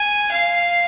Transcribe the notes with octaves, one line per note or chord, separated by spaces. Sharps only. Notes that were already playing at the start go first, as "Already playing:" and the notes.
Already playing: G#5
F5